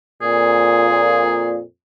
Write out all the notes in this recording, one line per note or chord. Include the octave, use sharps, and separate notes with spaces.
F2 A#2 G#4